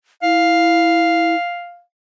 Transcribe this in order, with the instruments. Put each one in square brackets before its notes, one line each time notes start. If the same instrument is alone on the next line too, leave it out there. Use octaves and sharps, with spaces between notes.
[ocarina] E4 [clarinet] F5